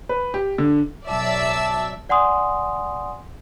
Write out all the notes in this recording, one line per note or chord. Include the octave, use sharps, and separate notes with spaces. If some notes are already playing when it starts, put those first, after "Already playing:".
B4
G4
D3
B1 F#3 D5 E5 A5 E6
D5 F#5 G#5 C6 D#6